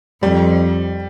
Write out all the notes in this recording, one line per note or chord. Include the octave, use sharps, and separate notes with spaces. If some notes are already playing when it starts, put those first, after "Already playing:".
F2 G3